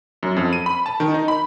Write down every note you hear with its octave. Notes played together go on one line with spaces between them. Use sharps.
F#2
F2
D#7
B5
A5
D#3
D#4
B5